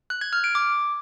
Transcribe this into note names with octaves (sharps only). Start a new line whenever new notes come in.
F#6
G#6
F6
D7
D6